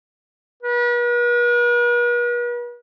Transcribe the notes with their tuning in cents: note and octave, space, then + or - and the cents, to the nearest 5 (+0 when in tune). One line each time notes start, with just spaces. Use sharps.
B4 -45